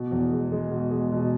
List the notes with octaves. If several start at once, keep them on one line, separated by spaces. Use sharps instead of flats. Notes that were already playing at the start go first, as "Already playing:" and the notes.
Already playing: B2
E2
G#3
G#3
B2
G#3
B2